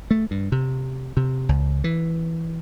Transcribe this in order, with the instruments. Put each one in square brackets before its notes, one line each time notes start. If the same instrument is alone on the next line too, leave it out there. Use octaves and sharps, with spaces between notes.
[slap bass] A3
G2
C3
C3
C#2
E3